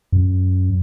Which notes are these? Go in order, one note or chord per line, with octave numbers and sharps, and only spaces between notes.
F#2